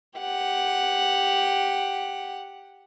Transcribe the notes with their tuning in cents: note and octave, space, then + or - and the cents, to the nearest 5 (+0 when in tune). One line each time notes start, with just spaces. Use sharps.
G4 +0 F#5 +0